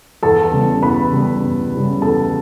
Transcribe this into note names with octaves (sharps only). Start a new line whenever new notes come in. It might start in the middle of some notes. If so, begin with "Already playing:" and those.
E2 A4 A5
C#3 G3 B3
E2 B4 B5
C#3 G3 B3
E2
C#3 G3 B3
E2 A4 A5